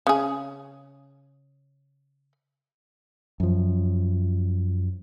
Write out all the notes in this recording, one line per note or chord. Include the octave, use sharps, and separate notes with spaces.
C#3 G#4
F#2 F3